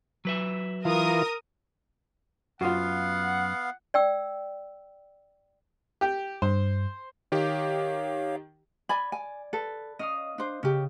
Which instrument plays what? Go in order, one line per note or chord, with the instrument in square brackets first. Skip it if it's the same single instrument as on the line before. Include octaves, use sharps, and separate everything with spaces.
[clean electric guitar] F#3 B4 E5
[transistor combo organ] E3 F4 [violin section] A#4 D#6
[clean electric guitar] F#2 [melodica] B3 F5 [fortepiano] F4 F#4 [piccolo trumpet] F#5
[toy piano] D5 G5 E6
[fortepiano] G4 G5
[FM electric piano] G2 [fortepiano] C5
[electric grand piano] D#3 G4 [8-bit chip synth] C#5 F5
[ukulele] D5 G#5 B5 [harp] G#6
[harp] D5 [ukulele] G#5
[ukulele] A4 [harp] B4
[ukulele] C#4 [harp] D#5 F5 D#6
[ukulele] D4 C5
[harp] C#3 [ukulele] C#4 G4